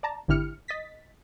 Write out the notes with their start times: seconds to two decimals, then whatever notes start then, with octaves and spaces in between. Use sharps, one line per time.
0.03 D5 A5 A#5
0.28 G#1 D3 E4 G4 F6 C#7
0.68 D#5 A6 B6